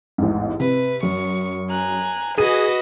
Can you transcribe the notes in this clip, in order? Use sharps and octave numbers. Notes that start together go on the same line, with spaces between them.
A1 E2 G#2
C3 B4
F#2 C#6
G#5 A#5 F#6
F#4 G#4 B4 D#5 D#7